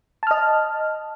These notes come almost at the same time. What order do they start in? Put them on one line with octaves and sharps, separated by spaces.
A5 F6 D#5